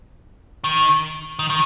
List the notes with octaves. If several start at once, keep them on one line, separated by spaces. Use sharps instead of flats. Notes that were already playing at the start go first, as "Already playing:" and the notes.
D#3
D#3
D#3